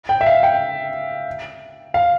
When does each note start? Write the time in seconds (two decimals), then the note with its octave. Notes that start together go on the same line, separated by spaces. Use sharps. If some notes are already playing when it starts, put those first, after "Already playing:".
0.09 G5
0.21 E5
0.26 F5
0.43 G5
1.94 F5